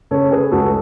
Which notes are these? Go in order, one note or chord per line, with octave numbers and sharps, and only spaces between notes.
C#3 A4 C#5
G#4 B4
C#2 F#4 A4